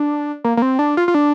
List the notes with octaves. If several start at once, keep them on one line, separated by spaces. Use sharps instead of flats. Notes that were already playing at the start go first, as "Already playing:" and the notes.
Already playing: D4
A#3
A#3
C4
D4
F4
F4
D4